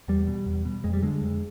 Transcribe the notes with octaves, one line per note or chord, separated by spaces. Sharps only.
E2 G3
B2
E2
B2
F2 G#3
G3
D3 G#3
F2